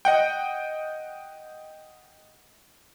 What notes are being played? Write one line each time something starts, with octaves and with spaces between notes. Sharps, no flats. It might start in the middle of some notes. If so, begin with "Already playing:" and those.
D#5 F#5 G5